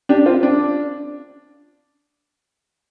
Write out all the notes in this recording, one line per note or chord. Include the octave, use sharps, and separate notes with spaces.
D4 G4
C4 F4
D4